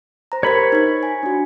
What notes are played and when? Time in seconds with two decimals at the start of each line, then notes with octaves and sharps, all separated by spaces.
0.32 C5 A#5
0.43 G4 A#4 C5 C#5 B5
0.72 D#4 G#6
1.03 G#5
1.23 D4 F#4